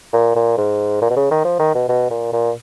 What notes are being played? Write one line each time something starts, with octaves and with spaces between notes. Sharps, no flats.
A#2
A#2
G#2
A#2
B2
C#3
D#3
F3
D#3
B2
B2
A#2
A#2